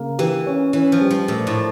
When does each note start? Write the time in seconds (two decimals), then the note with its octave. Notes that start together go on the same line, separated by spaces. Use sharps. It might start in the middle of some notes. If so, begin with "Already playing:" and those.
Already playing: C#3 A#3
0.19 E3 G4
0.46 C#4
0.73 E3 C#4
0.92 F3
1.01 G3
1.10 F3
1.28 A#2 A3
1.47 A2